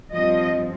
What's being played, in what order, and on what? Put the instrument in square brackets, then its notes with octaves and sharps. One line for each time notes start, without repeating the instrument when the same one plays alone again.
[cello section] G2 F3 C4 D#5